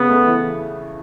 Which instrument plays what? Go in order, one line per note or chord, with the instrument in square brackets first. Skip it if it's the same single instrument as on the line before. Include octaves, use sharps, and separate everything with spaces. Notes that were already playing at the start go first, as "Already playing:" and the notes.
Already playing: [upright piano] C#3 [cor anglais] B3
[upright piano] A3
E3